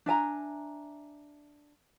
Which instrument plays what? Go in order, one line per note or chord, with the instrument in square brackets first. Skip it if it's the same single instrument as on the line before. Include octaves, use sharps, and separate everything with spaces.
[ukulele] D4 E5 G#5 A#5